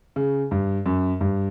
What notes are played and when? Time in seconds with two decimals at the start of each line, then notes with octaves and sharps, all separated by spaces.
0.16 C#3
0.51 G2
0.86 F#2
1.21 G2